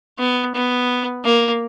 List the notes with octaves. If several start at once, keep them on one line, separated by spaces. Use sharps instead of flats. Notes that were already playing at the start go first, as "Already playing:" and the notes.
B3
B3
A#3